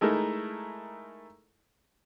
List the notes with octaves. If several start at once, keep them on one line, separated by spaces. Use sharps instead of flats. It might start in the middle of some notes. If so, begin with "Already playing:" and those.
G#3 A3 D#4 E4 A#4